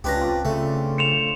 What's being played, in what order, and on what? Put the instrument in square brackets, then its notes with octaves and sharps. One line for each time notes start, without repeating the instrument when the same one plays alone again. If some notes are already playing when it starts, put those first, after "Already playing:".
[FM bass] C#2 [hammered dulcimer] C#4 D4 F4 [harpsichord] G4 B4 A#5
[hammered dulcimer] C4 F4 D5
[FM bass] C#3 [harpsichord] A3
[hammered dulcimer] C5 F5 [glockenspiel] C#7 E7 F7